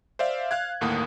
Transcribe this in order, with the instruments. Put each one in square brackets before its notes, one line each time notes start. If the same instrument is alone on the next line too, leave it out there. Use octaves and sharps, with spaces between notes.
[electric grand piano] C5 D5 E5 F5
F5 F#6 G#6
G1 D#2 A2 A#3 F#5 D#6